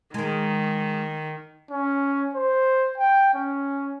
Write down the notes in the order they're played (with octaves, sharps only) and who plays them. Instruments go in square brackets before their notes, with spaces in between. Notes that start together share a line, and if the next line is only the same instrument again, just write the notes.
[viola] D#3 [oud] G#3 A#4
[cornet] C#4
C5
G5
C#4